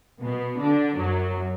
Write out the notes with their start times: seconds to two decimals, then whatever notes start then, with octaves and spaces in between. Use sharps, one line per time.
0.21 B2 B3
0.59 D3 D4
0.96 F#2 F#3